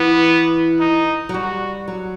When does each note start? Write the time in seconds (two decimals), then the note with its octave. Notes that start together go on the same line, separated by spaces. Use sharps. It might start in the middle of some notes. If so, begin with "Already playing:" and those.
Already playing: E3 B3
0.80 D#4
1.29 F#3
1.34 G3 F#4
1.88 F#3